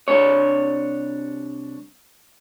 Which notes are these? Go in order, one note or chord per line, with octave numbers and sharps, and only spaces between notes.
C2 D4 C#5